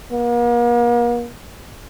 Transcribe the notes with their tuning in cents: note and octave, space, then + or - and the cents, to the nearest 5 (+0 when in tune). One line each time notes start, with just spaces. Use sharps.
A#3 +40